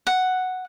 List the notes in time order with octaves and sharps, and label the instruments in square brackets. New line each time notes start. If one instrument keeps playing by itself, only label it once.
[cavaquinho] F#5